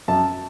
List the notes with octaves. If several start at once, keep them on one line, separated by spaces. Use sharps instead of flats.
F#2 A5